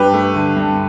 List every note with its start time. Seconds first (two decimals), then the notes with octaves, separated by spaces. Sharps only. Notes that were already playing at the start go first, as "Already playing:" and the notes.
Already playing: G2 G4 B4
0.13 A3
0.35 D3
0.57 G2